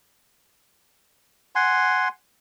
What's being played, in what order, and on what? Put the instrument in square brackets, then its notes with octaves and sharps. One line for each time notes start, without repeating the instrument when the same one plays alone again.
[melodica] F#5 G#5 C6